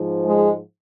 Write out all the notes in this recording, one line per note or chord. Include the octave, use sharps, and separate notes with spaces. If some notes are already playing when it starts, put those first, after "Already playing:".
Already playing: G#2 F3
G#3